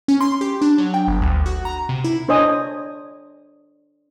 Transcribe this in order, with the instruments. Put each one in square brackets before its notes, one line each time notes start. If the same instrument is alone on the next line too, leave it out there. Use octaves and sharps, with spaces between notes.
[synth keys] C#4
C6
G4
D4
F#3
G5
G1
D2
F#4
A#5
C3
E4
[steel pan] D4 C5 C#5 D#5 G#5 D#6